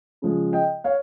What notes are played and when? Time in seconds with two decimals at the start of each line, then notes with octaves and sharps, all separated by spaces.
0.22 C#3 F3 G#3
0.53 D#5 G5
0.84 C#5 F5